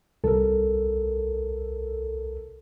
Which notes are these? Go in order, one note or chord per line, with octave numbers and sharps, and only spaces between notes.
C2 A4 A#4